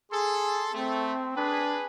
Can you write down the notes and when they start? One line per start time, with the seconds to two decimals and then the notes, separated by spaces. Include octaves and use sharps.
0.12 G#4 A4 C6
0.73 A3 C4
1.37 D4 G#4 B4